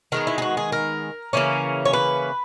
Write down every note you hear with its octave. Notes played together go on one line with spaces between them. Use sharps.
D#3 G#3 B3 A#4
E4
G#4
F#4
G#4
A#4
C#3 E3 A#3 C#4
C#5
B4